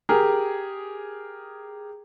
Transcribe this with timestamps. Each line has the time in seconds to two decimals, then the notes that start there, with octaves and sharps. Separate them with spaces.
0.09 G4 G#4 A#4